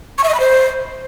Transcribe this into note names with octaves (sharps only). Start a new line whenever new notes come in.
C#6
E5
D#5
B5
C5